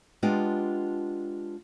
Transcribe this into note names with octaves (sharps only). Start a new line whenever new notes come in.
G#3 B3 D4 F4 G4